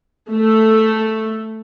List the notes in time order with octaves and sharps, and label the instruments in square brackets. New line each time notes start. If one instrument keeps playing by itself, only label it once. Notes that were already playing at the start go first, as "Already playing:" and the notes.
[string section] A3